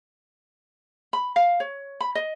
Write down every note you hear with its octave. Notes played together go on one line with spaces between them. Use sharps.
B5
F5
C#5
B5
D#5